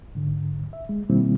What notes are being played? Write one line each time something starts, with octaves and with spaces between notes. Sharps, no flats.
G#2 D3
E5
G#3
B2 D#3 G3 A#3 C4 E4